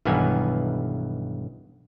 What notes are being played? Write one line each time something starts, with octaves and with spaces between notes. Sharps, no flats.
B1 G2 D#3 E3 B3 G#5